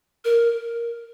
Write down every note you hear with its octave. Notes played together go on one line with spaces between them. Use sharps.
A#4